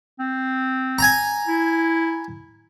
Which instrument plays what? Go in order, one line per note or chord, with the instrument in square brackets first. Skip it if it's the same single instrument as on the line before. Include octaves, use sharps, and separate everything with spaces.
[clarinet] C4
[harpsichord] G#5 A#5
[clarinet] E4